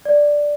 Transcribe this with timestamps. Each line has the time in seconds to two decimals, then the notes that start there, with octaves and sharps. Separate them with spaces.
0.05 D5